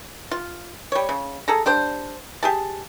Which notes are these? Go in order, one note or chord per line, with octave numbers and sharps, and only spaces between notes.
F4
G3 C#5
C#3
G#4 A4 A#5
G3 D4 C5
G4 G#4 A5